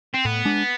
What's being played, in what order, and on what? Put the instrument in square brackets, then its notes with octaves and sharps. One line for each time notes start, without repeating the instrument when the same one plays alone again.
[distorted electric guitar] C4
[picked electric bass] A2 [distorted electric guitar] B3
[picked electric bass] G#3 D4